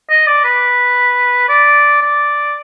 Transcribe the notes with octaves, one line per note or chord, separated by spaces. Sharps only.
D#5
D5
B4
D5
D5